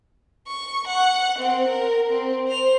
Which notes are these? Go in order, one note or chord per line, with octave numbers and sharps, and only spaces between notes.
C#6
F#5
C4
A#4
C4
C5 F7